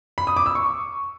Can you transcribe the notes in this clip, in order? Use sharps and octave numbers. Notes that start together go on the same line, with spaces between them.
B5
D#6
D6
E6
C#6